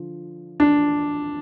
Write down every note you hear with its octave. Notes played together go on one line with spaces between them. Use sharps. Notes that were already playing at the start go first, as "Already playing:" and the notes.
Already playing: D3 F3
D4